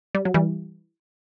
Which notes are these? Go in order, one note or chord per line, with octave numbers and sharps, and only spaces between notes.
G3
F#3
E3 G3